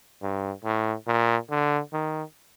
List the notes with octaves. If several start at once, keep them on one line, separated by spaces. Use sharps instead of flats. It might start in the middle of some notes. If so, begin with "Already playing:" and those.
G2
A2
A#2
D3
D#3